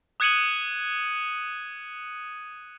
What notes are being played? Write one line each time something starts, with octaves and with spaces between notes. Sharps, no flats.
D#6 F#6 G#6 C#7 D#7 F#7